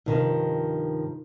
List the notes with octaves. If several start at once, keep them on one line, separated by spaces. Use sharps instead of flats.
G2 C3 D#3 F3 D#4